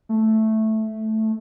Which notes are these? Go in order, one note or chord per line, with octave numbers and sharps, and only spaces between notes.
A3